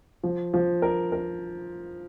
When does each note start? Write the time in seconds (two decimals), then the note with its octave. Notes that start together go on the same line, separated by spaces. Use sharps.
0.24 F3
0.54 F3
0.82 A#4
1.12 A#4